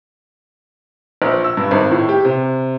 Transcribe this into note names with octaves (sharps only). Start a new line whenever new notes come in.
A#1
E6
G2
G#1
A2
G4
C3